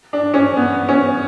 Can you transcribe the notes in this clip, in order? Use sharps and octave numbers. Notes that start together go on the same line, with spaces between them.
D4
C#4
B3
C#4